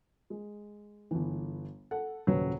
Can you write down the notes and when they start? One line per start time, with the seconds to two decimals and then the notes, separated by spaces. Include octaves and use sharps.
0.30 G#3
1.11 G1 E3
1.91 A4 F#5
2.27 D#1 C#3 F#3 B4